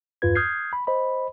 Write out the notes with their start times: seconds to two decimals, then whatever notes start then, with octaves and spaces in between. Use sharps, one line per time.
0.22 E2 G2 F4 B4 G#6
0.35 D#6 F6 G6 G#6 C7
0.73 B5
0.87 C5 D#5 B5